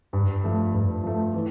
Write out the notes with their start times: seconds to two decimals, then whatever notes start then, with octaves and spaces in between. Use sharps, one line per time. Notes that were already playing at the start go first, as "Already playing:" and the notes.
0.13 G2
0.44 F3 A3
0.74 G2
1.04 F3 A3
1.34 E3